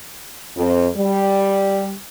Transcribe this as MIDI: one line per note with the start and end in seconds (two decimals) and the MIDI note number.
0.56 0.87 41
0.96 1.93 55